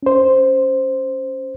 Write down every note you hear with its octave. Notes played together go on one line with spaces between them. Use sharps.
C#4 C5